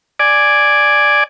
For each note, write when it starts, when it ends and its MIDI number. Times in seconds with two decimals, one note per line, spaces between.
0.20 1.24 74
0.20 1.24 80